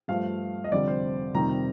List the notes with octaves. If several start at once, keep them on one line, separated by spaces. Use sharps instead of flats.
G2 F3 A3 F5
D#5
F1 F2 D3 G3 C4 D5
C5
F1 F2 C3 D#3 G3 A#5